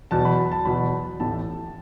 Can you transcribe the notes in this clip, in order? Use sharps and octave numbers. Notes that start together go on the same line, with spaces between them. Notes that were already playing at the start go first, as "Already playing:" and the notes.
E2 B2 F#3 A5
B5
A5
E2 B2 F#3 B5
A1 A2 A3 A5